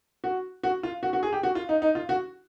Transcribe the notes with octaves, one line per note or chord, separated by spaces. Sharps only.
F#4
F#4
F4
F#4
F#4
G#4
G4
F#4
F4
D#4
D#4
F4
F#4